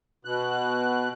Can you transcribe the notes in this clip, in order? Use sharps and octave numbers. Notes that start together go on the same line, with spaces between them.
B2 F#6